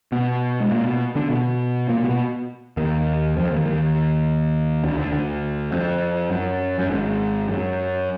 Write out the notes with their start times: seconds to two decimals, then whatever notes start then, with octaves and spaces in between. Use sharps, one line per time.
0.12 B2 B3
0.60 G#3
0.71 A#2 A#3
0.86 B2 B3
1.15 D3 D4
1.30 B2 B3
1.89 A#2 A#3
2.04 B2 B3
2.77 D#2 D#3
3.36 F2 F3
3.51 D#2 D#3
3.65 D#2 D#3
4.83 D2 D3
4.98 D2 D3
5.13 D2 D3
5.72 F2
6.31 F#2
6.79 F#2
6.89 G#1 G#2
7.49 F#2